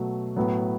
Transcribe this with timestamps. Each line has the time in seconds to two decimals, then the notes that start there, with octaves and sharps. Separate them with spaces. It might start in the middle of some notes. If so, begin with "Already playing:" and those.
Already playing: B2 F#3 A3 F#4
0.36 A2 F#3 B3